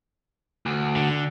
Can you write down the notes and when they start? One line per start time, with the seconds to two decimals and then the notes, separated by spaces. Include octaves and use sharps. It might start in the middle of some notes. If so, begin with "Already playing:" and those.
0.66 D2
0.96 D3